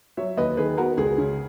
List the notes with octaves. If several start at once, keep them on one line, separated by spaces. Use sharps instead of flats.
F#3 C#5 E5
D#2 B4 D#5
D#3 G#4 B4
B3 F#4 A#4
C#2 G#4
C#3